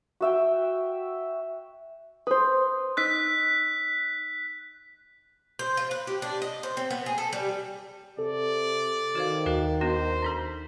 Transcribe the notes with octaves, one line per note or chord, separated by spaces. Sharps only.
F#4 E5 G5
B4 C5 C6 D#6
D#4 E6 F#6 B6
C5
F4
B4
G4
D4
D#5
C5
C4
B3
G#4
A4
G3
C3 A4 D5
D#3 F#4 C5 F5
D#2 F#4 A#4 F5
B3 D4 F#4 C5
D4 D#4 A4